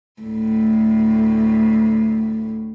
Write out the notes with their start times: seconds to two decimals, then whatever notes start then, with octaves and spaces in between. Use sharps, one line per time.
0.22 D2 A2